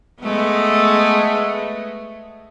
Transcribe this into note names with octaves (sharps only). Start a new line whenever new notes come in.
G#3 A3 B3